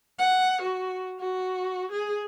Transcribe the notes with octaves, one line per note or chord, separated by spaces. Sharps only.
F#5
F#4
F#4
G#4